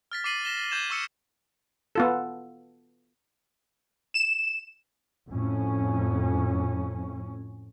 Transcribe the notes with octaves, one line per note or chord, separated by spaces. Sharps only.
F6 A6 B6
D6 A6 C7 D#7 F#7
A#6 B6 E7 G7
A6
D6 G6 G#6 E7
C#6 E6 C#7
B3 F4 A4
E7
F2 A2 C#4